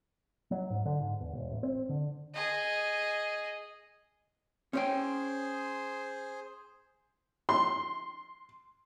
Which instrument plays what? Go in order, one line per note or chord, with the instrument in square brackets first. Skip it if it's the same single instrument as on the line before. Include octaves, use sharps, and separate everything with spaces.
[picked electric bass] F#3
G#2
D3
G#2
E2
E1
A1
C4
D3
[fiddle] G#4 D#5
[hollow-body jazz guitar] C#4 C#5 G5 [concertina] G#4 C5
[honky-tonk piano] C6